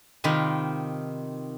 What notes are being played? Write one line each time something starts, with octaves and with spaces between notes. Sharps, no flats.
C3 D#3 F4 A#5 B5